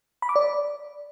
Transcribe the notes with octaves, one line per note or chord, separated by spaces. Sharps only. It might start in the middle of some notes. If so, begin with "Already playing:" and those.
B5
D6
D5